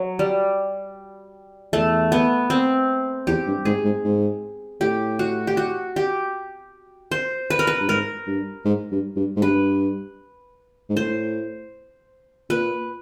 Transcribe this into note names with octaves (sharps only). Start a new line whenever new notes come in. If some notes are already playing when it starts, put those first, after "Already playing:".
Already playing: F#3
G3
E2 A3
B3
C4
E2 G4
G2
G#2 G#4
G#2
G#2
A2 G4
F#4
G4
F#4
G4
C5
B4
A#4
B4
G2
G#2 A#4
G2
G#2
G2
G2
G#2
G2 B4
G#2
A2 C5
A#2 B4